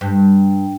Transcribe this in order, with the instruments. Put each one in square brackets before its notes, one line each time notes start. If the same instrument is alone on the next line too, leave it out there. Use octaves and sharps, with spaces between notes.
[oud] G2